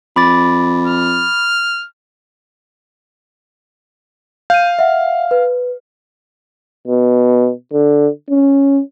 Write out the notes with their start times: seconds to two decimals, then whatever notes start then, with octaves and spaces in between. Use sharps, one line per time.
0.16 F2 B5 D6 A6
0.87 F6
4.50 F5 G6 D#7
4.79 E5 F#5
5.31 B4
6.88 B2
7.73 D3
8.30 C#4